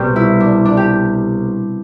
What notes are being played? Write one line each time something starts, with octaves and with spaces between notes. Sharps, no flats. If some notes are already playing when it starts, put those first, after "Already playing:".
Already playing: C2 B2 G4
E4
D4
D4
G4